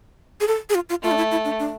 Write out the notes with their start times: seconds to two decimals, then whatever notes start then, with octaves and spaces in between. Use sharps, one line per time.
0.41 G#4
0.47 A4
0.70 G#4
0.75 F4
0.90 F4
1.03 A3 F4
1.11 D4
1.17 E4
1.31 E4
1.45 D4
1.59 D4